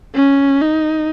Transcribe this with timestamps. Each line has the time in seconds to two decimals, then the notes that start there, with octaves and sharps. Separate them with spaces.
0.15 C#4
0.61 D#4